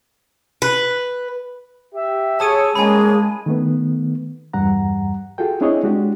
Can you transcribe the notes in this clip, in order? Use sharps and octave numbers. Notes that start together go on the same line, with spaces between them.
B4
G4 E5
G#4 A4 C#5 A5 D#6 D#7
C2 G#3 A#3 C#4 G#4 G#5 B5
D#3 A3 B3
E2 G2 G3 F#5 A#5
F4 F#4 G#4 A4 G5
C4 D4 E4 G#4 C#5 D#5
G#3 D4 F#4 G4